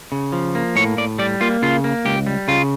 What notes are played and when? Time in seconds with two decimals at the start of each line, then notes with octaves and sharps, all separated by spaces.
0.12 C#3
0.33 F3
0.55 A#3
0.76 A2 C#5
0.97 A2 D5
1.19 G3 D5
1.41 A#3 F4
1.62 C#3 F4
1.84 A#3
2.05 C#2 G4
2.27 G3
2.48 C#3 F4